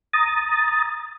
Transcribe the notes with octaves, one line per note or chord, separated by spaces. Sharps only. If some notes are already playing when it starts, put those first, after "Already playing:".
A#5 D#6 A6